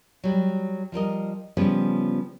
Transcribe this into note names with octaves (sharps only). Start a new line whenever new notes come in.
F#3 G3
F3 G3 A#4 D#5
C#3 F3 G3 B3